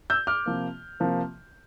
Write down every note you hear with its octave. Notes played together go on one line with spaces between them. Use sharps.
E6 G6
D6 F6
C3 F3 A#3
C3 F3 A#3